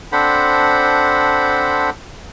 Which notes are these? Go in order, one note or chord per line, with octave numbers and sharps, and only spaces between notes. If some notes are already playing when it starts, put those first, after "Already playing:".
C4 D4 A4 C5 F#5 B5